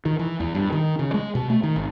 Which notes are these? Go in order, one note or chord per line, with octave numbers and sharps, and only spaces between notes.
D#3
E3
E2
G2
D#3
C#3
G#3
B2
A3
D#3
G#1